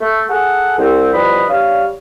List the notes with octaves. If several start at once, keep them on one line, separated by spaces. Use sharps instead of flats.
A3
G#4 A4 F#5
C2 C4
E2 F3 G3 B4 D#5 B5
G3 D4 C#5 F5